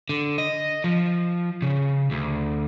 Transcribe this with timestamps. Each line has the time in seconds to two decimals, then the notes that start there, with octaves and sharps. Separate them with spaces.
0.09 D3
0.38 D#5
0.84 F3
1.62 C#3
2.11 D2